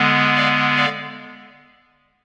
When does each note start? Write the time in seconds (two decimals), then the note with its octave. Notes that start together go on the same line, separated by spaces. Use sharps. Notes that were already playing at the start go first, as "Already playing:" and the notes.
Already playing: D3 G#3 B3
0.36 D5 F5
0.77 D5 F5